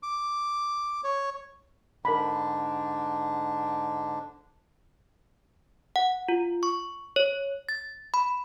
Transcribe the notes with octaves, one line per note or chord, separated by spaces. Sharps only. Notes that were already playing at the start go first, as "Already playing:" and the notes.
D6
C#5
G#2 D3 D4 A#4 B5
F#5
F4
C#6
C#5
A6
B5